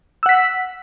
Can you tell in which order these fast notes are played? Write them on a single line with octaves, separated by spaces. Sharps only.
E6 F#5 B6